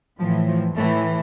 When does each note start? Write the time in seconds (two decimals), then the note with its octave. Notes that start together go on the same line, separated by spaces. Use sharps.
0.19 A2 E3 F3
0.47 F3
0.76 A2 E3 A3